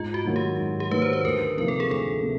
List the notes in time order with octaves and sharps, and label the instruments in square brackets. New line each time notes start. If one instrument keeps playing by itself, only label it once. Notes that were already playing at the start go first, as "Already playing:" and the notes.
Already playing: [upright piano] G#2 [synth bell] F4
[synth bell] F#4
[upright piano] D#3 F#3 A#3
[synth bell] G4
[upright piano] G#2
[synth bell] G4
[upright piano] D#3 F#3 A#3 [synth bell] B4
[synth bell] C5
B4
[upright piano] D2 [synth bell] A#4
[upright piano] C3 F3 A#3 D#4 [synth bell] A#4
[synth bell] A4
G#4
[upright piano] D2 [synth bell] A4
[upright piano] C3